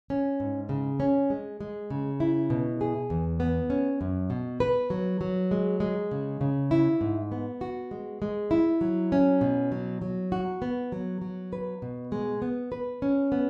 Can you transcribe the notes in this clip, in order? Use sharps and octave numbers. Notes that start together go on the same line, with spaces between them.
C#4
G#2
C#3
C#4
G#3
G#3
C#3
E4
B2
G#4
E2
B3
C#4
F#2
B2
B4
F#3
F#3
G#3
G#3
C#3
C#3
E4
G#2
B3
F#4
G#3
G#3
E4
F#3
C#4
B2
F#3
F#3
F#4
B3
F#3
F#3
B4
B2
G#3
B3
B4
C#4
B3